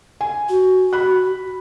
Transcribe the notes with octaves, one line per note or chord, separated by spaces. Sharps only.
G#5
F#4
B5 F#6